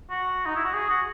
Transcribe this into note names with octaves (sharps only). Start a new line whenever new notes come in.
F#4
D#4
E4
F#4
G#4
F#4